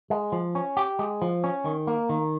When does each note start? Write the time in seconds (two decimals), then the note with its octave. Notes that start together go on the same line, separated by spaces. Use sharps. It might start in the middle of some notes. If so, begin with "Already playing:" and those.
0.10 G#3
0.32 F3
0.55 C#4
0.77 G4
0.99 G#3
1.22 F3
1.44 C#4
1.65 D#3
1.87 A#3
2.09 D#3